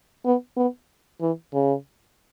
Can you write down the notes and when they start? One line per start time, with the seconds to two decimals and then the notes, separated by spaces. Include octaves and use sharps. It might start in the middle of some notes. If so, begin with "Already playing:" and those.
0.25 B3
0.57 B3
1.21 E3
1.54 C#3